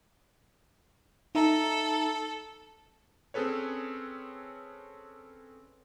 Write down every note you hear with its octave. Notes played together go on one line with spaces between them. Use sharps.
D#4 A4 E5 A#5
C4 C#4 G#4 A4 B4 C#5